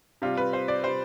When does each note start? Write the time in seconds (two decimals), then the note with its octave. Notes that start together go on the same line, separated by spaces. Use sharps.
0.22 C3 G3 F4
0.37 B4
0.53 C5
0.68 D5
0.84 C3 G3 C5